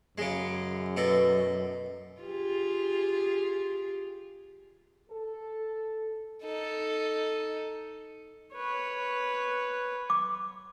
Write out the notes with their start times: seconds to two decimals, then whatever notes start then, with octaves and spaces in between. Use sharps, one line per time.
0.18 F#2 C#3 G#3
0.97 B2 A4
2.21 F4 G4 G#4
5.10 A4
6.43 D#4 A4
8.54 B4 C#5
10.10 D6